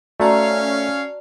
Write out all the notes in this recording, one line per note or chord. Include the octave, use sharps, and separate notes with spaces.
A3 C#4 F#4 D5 F5 A5 A#5